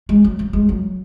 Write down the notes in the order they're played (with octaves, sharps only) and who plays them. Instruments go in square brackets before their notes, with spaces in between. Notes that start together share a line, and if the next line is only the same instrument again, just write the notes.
[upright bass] G#3
F#3
F#3
G#3
F#3